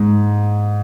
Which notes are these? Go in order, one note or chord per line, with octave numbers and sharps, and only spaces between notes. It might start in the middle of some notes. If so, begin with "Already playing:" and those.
Already playing: G#2